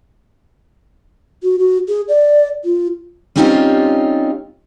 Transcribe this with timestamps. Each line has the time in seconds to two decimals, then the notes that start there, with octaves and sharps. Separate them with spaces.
1.43 F#4
1.59 F#4
1.88 G#4
2.09 D5
2.65 F4
3.36 G3 C4 C#4 D#4 F4 G4